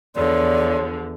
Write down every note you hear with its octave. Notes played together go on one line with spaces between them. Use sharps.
E2 D3 F3 C#5 D5 C6